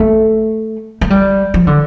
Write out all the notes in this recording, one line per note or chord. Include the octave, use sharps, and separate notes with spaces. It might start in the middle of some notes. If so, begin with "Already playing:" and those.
Already playing: A3
A3
G3
F3
D3